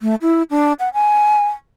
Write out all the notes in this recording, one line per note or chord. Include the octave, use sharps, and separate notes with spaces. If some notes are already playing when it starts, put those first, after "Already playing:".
A3
E4
D4
F#5
G#5